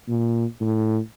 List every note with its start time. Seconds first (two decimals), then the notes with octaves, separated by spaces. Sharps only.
0.08 A#2
0.61 A2